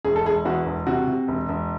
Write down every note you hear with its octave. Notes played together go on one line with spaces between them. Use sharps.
E1 G#4
A4
E1 G#4
E2 F#4
E1
C3 F#4
C3
E1
E1